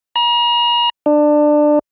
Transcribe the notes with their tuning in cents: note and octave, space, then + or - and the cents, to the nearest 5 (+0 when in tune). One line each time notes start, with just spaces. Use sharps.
A#5 +40
D4 +20